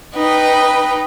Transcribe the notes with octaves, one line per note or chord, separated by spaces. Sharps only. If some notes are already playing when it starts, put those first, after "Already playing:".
D#4 B4 G5